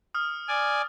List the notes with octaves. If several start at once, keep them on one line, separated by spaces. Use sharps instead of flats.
D#6 F6
D5 G#5